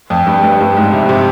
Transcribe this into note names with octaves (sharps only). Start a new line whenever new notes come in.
F2
G2
G2
G2
G#2
C3
C3